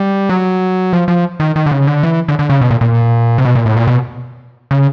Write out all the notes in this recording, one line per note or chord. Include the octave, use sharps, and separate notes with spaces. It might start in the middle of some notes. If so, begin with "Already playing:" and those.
Already playing: G3
F#3
F3
F3
D#3
D#3
D3
C#3
D3
E3
D3
D3
C#3
B2
A#2
A#2
C3
B2
A#2
A2
A#2
B2
C#3